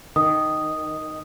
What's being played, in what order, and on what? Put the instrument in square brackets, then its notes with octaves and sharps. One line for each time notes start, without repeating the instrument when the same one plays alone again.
[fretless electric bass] D#3 [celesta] D#6